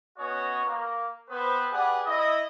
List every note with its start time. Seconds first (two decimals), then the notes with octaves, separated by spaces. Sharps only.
0.18 B3 C#4 F#4 C#5 D#5
0.64 A#3
1.29 B3 C4 B4 C5
1.71 G4 G#4 B4 D5 F#5
2.05 E4 D#5